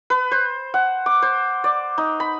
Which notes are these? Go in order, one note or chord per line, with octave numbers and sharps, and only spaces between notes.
B4
C5
F#5
D6
C5
D5
D#4
B5